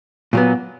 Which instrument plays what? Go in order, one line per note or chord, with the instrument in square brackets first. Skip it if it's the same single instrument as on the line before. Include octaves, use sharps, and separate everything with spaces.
[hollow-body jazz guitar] A#2 F#3 B3